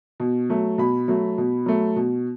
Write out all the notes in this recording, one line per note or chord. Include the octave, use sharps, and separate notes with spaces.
B2
F#3 A3
B2 B5
F#3 A3
B2
F#3 A3
B2